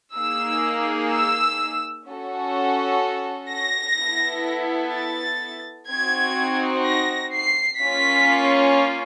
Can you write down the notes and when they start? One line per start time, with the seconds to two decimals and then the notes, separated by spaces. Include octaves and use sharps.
0.15 A#3 D#4 G#4 E6
1.11 E6
2.06 C#4 F#4 A4
3.50 A#6
3.98 B3 E4 A4
4.94 A6
5.90 C4 D#4 F#4 G#6
6.85 A#6
7.33 C7
7.81 A#3 C#4 F4 B6